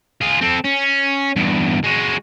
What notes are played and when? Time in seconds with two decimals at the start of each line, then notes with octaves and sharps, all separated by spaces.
0.21 F4 G#4
0.41 C4 A4
0.65 C#4
1.36 E2 G2
1.84 G#3 F#4